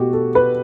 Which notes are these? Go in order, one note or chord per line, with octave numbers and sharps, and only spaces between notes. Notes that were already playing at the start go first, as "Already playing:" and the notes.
Already playing: B2 A3 F#4 G4
A4
B4